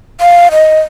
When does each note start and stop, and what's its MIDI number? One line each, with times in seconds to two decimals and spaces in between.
0.21 0.48 77
0.52 0.80 75